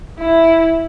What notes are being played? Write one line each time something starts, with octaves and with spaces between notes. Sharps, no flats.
E4